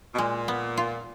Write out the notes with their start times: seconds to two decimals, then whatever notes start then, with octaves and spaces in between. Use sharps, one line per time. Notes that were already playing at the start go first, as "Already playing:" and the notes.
0.14 B2
0.18 A#2 G#3
0.48 B3
0.77 F4